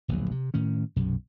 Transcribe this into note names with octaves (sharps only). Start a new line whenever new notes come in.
D1 A#1 E2 F#3
C3
A2 D#3 C#4
B1 F#2 C3